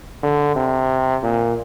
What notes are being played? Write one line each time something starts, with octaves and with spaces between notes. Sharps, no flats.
D3
C3
A#2